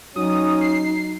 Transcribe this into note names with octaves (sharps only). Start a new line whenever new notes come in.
F#3 C#4 D#4 D#6
C7